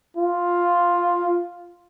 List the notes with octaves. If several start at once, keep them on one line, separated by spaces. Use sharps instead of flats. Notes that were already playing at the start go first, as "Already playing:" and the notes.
F4